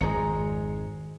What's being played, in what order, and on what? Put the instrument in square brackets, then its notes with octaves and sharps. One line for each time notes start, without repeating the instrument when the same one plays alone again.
[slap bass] G#1 F2 [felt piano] G#3 A#5 C#7